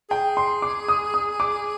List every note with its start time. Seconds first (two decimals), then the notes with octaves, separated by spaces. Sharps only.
0.10 G#4 G5
0.37 C6
0.62 D6
0.88 D#6
1.14 D#6
1.40 D6